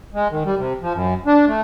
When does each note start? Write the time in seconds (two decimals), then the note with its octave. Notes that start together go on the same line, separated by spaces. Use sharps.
0.14 G#3
0.31 D#3
0.45 G3
0.58 C3
0.82 F3
0.94 F#2
1.26 D4
1.47 A3